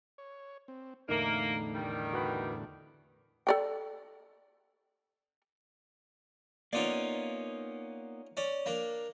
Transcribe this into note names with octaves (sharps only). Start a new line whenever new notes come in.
C#5
C4
E2 A2 D3 A3 A#3 D#4
D#3 G3
F#4 B4 B5
A4 D5 G5
A#3 B3 C#4 D#4 F4 D5
C#4 D5
A#3 D4